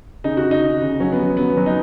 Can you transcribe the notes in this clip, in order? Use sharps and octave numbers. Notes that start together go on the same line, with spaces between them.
C#3 D#4
F#4
C#3
D#4
C#3
C#3
F#3 C#4
B3
F#3
F#3 B3
F#3
D#4